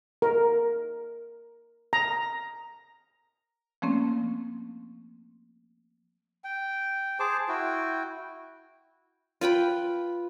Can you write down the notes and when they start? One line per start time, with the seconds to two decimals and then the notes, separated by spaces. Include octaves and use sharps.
0.22 A#4
1.93 A#5
3.82 F3 A3 A#3 C4 C#4
6.44 G5
7.20 G#4 C5 A5 D6
7.48 E4 F#4 G5
9.41 F4 B4 G5 B5